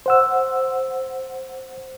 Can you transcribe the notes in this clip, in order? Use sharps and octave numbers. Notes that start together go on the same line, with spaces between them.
C5 F#5 E6